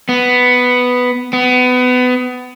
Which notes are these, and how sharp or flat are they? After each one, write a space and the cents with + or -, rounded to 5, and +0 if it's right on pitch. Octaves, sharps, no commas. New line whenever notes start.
B3 +5
B3 +25